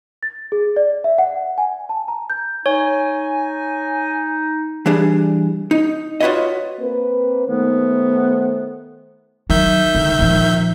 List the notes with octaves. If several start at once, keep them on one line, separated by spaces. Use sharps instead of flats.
A6
G#4
D5
E5
F#5
G#5
A5
A#5
G6
D#4 C#5 G#5
E3 G3 D4 G#4
D#4
F4 F#4 B4 C#5 D#5
A#3 C4 B4
D#3 A3 B3 C5
D#3 F#3 E5 G6
D3
A#2 F3